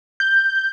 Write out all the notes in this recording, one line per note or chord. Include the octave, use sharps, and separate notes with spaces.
G6